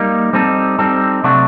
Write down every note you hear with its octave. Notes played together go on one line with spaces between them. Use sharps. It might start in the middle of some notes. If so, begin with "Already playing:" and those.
Already playing: G3 A#3 D#4
G3 C4 D#4 A4
G3 C4 D#4 A4
C3 F#3 A3 D4 F#4